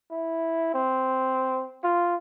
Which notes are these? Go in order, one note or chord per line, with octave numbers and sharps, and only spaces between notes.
E4
C4
F4